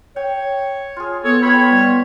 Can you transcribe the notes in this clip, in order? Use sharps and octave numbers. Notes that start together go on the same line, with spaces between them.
C#5 G5
F4 G#4
B3 A4 C#5
F4 C#5 G5 B5
G3